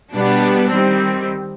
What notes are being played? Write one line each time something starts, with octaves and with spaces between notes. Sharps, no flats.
B2 G3 B3 D4
D#3 G3 C4